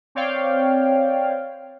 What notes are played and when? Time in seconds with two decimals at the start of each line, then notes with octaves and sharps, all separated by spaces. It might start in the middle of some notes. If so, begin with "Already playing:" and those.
0.15 C4 C#5 D5 F5 G5